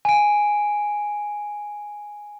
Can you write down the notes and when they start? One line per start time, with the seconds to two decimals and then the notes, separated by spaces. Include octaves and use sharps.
0.05 G#5 D7